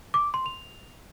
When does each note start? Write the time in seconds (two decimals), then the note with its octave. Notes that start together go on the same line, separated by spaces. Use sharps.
0.14 D6
0.34 C6
0.46 F7